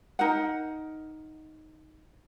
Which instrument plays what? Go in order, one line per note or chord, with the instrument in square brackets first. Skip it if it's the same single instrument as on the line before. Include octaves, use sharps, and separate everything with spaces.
[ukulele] D#4 A#4 F#5